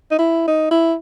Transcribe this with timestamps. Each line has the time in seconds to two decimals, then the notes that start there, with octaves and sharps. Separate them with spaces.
0.11 D#4
0.19 E4
0.47 D#4
0.71 E4